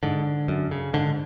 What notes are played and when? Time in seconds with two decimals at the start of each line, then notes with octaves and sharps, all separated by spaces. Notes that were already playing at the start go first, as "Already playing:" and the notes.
0.03 G#2 D3
0.48 F#2
0.71 C#3
0.94 G#2 D3